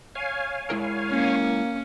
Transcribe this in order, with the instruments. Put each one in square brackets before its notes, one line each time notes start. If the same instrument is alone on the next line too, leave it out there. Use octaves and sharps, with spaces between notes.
[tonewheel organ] C#5 F5 G#5
[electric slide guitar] G#3 E4 A#4
[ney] A#3 [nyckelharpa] C#4